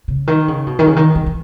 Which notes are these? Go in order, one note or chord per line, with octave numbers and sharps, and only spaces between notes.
C#3
D#3
C#3
B2
D#3
C#3
D#3
D#3
E3